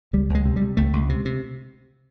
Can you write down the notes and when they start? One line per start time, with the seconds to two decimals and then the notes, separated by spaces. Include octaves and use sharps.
0.13 C#2 G3
0.29 C#2
0.35 G#3
0.45 C3
0.56 G3
0.62 C3
0.77 C#2 A3
0.93 C#2
1.09 C3
1.25 C3